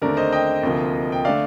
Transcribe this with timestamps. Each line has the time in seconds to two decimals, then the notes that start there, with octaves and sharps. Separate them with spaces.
0.02 D#2 D3 A3 C4 A#4 D5
0.17 C5 D#5
0.33 D#5 G5
0.63 D2 C3 F3 A#3
1.12 G5
1.25 D3 A3 D5 F5